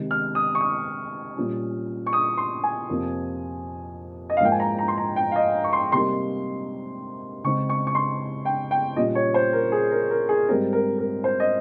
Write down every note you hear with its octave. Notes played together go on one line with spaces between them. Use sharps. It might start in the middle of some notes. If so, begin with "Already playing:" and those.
Already playing: C3 D#3 G#3
F6
D#6
C#6
D#6
A#2 G3 C#4
C#6
D#6
C6
G#5
F2 C3 F3 A#3
D#5
F5
G#2 F3 A#3 D#4 G5
G#5
A#5
A#5
C6
A#5
G5
F5
D#5
C#6
C6
C3 G3 A#3 D#4 C6
C#3 G#3 C4 D#4 C#6
C#6
C#6
C6
G5
G5
A#2 G3 C#4 D#5
C#5
C5
A#4
G#4
A#4
A#4
G#4
G#2 G3 C4 A#4
A#4
A#4
C5
D#5